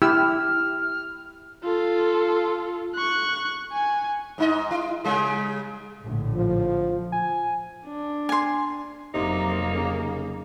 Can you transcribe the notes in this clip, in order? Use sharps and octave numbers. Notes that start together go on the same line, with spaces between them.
E4 G4 E6 F6
F4 A4
C#6 F#6
G#5
G#2 D#4 D#5
E4
C#3 G3 G#4
A#1 A2 D3
F3
G#5
D4
G#5 C6
F1 C3 F#3 A#3 D#4
C#3